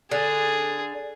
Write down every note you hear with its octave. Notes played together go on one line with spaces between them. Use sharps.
D3 G#4